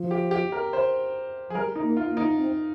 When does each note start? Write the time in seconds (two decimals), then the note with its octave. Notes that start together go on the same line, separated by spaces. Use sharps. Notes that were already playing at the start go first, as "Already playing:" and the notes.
Already playing: F3
0.11 G4
0.31 G4
0.52 A#4
0.73 C5
1.49 F3 G#4
1.55 G3 A#4
1.75 D#4
1.83 A#3
1.97 F4
2.10 A#3
2.17 D#4
2.38 C4